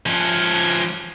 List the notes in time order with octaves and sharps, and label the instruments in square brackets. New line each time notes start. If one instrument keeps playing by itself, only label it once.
[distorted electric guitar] F3 C#4